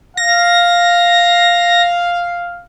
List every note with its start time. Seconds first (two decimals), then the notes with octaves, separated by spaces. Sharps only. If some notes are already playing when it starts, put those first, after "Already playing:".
0.17 F5 A#6